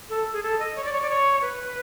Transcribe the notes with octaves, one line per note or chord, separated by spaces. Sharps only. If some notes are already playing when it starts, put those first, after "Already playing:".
A4
G#4
A4
D#5
C#5
D5
C#5
D5
C#5
B4